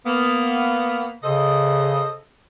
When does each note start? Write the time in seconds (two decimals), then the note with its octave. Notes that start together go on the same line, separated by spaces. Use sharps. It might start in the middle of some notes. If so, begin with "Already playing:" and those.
0.06 A#3 B3
1.24 C#3 A4 C5 D#5